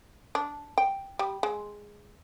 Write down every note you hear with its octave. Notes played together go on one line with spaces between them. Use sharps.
D4
G5
G3
G#3